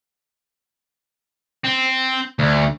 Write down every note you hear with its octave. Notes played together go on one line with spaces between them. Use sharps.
C4
D2